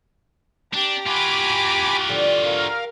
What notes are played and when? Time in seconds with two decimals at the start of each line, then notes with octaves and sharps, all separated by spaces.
0.73 D4 G4 A#5
1.06 F4 F#4 G#5 B5 D6
2.09 D3 F3
2.44 A#4 F5